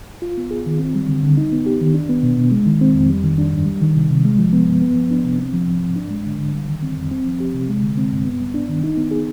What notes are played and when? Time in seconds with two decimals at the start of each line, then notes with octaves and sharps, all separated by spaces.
0.22 F4
0.38 B3
0.51 G#4
0.66 D#3
0.80 C4
0.95 G3
1.09 D3
1.23 D3
1.37 D#4
1.52 B3
1.66 G4
1.81 D#3
1.94 D4
2.09 B3
2.23 B2
2.38 B2
2.51 G#3
2.67 D#3
2.81 C4
2.95 F2
3.10 G3
3.24 D#3
3.38 D4
3.53 G2
3.66 G3
3.82 D#3
3.96 C3
4.10 C3
4.25 G#3
4.39 F3
4.53 B3
4.67 G2
4.82 B3
4.95 F3
5.11 D4
5.25 C3
5.38 C4
5.53 F3
5.67 G#2
5.82 G#2
5.96 D4
6.11 G#3
6.25 D3
6.39 D3
6.53 G3
6.69 D#3
6.82 C4
6.97 F2
7.11 C4
7.26 F3
7.40 G4
7.54 C3
7.69 G#3
7.83 D3
7.97 C4
8.11 G2
8.25 B3
8.41 G3
8.54 D4
8.69 D#3
8.84 D#4
8.97 B3
9.11 G#4